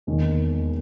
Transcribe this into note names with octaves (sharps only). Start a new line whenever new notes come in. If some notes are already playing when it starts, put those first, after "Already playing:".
E1 D#2 D#3 G#3